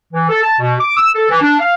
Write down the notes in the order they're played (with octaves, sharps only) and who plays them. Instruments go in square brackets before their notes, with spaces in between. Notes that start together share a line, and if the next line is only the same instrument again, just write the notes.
[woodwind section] E3
A4
A5
B2
D6
E6
A4
E3
D4
F5